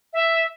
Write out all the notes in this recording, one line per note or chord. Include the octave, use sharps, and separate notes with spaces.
E5